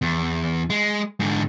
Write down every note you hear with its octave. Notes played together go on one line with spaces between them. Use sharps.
E2
G#3
G#2 D3